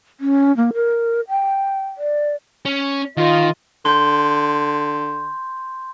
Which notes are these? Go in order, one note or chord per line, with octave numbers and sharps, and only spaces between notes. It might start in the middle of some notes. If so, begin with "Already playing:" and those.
C#4
A#3
A#4
G5
D5
C#4
D#3 F4 D#5
D3 C6 G6